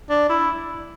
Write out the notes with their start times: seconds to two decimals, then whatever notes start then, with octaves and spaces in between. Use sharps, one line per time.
0.10 D4
0.30 E4